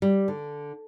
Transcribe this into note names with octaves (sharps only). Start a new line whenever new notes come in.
G3
D3